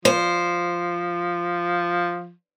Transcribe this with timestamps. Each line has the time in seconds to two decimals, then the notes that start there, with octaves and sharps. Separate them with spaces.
0.05 F3 C5